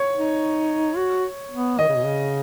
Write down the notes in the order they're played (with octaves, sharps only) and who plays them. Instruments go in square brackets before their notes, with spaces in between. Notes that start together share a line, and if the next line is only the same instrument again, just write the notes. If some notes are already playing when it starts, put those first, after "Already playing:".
Already playing: [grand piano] C#5 C#6
[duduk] D#4
F#4
B3
[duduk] D#3 [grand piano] D#5
[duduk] C#3
B2
C#3